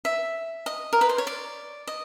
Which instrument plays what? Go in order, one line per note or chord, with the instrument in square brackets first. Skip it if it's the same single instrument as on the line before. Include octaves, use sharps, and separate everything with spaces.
[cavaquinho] E5
D#5
A#4
B4
C5
C#5
D5
D#5